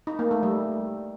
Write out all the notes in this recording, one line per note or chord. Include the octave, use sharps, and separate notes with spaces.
D#4
A#3
A3
G3